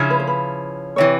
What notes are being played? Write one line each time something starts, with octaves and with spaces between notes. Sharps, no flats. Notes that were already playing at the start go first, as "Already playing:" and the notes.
Already playing: C#3 F3 C#4 E4
B4
C5
B4
C3 E3 C#5